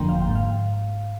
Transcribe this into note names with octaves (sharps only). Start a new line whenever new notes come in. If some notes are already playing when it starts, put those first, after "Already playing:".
Already playing: G1 F2 D3 F3 A#3 G5 A#5 C6
F5
G5
G#2
F5